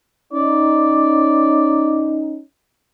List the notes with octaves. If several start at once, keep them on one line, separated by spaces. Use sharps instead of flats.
C#4 D#4 D5